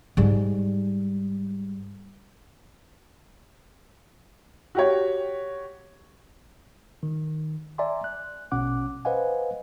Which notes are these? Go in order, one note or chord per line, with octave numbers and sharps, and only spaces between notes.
G#2 G3
F#4 G4 C#5
D#3
D5 E5 G#5 A#5 C6
F#6
A#1 B2 C#4 F#5 D6 F#6
B4 C5 D#5 F5 F#5 G#5